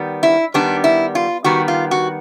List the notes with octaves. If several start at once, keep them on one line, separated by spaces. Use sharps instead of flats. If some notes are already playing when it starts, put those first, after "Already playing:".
Already playing: D#3 G3 B3
E4
D#3 G3 B3 D4
E4
F4
D#3 G3 B3 F#4
F4
F#4